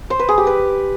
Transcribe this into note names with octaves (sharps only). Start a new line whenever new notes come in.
C5
B4
G#4
G4
B4